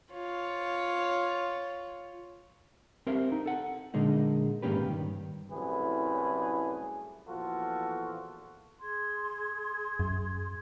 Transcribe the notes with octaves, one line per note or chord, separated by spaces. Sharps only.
F4 C#5
C4 G4 A#4 C5 E5 F5
D#4
A4 F#5
A#2 D3 G#3 A#3 D#4
G#2 D#3 A#3 C#4 G4 B4
G2 D#3
C2 F#2 A2 A3 G#4 B4
E2 A#2 F3 F4 F#4 A4
G#4 C6 G#6
F#2